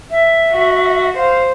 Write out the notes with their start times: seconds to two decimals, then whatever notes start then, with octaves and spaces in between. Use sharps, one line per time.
0.11 E5
0.53 F#4
1.17 C5 F5